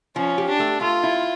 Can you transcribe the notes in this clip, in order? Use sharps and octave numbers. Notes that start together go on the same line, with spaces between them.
F3 C#4
G4
D4
A3
A3 F4
E4